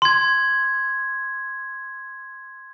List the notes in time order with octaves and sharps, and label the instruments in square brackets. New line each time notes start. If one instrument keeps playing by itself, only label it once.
[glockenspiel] C6 G#6